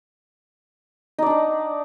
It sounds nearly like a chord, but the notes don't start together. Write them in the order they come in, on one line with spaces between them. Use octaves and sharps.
D#4 D5 D4 F#5